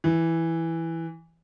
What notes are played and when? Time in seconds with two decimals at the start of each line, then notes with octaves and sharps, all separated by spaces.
0.04 E3